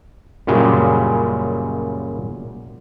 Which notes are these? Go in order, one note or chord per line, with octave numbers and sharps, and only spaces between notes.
F#2 A#2 C#3 G3 G#3